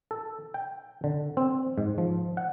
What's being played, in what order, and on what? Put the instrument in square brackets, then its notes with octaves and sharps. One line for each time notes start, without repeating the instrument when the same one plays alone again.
[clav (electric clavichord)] A4
G5
D3
C4
G#2
F3
F#5